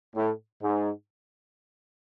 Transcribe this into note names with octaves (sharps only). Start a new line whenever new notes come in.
A2
G#2